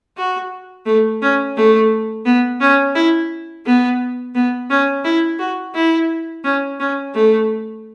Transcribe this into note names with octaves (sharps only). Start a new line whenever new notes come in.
F#4
A3
C#4
A3
B3
C#4
E4
B3
B3
C#4
E4
F#4
E4
C#4
C#4
A3